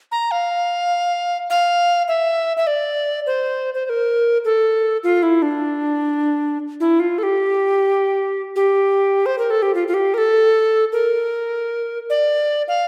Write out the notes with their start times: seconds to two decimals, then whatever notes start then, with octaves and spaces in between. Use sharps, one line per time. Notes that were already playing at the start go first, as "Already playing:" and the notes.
0.12 A#5
0.31 F5
1.50 F5
2.08 E5
2.57 E5
2.67 D5
3.26 C5
3.74 C5
3.85 C5
3.90 A#4
4.45 A4
5.04 F4
5.23 E4
5.42 D4
6.80 E4
7.00 F4
7.18 A4
7.23 G4
8.56 G4
9.26 C5
9.38 A#4
9.51 A4
9.62 G4
9.75 F4
9.88 F4
9.94 G4
10.14 A#4
10.18 A4
10.92 A#4
12.10 D5
12.68 F5